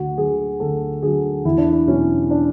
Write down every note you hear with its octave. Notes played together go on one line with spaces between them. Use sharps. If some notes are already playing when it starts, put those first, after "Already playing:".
Already playing: D2 F#4
D3 F#3 G#4
D2 A4
D3 F#3 G#4
E2 E4
D4
E4
B2 F#3 C#4
D4